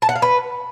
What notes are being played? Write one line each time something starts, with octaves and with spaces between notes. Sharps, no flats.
A5
F#5
F5
B4